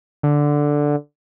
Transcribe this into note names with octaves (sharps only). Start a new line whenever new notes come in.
D3